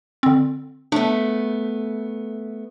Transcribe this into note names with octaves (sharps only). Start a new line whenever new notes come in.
D3 C4
A3 B3 D4